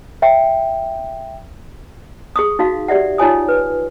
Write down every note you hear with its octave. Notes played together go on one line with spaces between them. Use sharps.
E5 G5
G#4 C#6 D#6
D#4 F#4 F5
G4 D5 E5 F#5
D#4 F4 C#5 G#5 D#6
B4